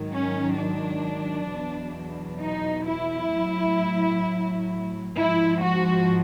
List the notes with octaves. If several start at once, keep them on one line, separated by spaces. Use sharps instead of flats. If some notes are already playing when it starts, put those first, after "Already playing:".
Already playing: G#2 D#3 F#3
C#4
D4
E2 B2 F#3
D#4
E4
A2 F#3
G#2 F3 E4
F#4